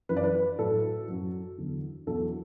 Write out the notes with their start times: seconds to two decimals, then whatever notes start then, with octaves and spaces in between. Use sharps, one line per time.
0.09 F#2 E3 B4
0.17 D5
0.24 B4
0.59 A2 F#3 A4
1.08 F#2 F#3
1.58 E2 D3 F#3
2.07 E2 B2 F#3 A4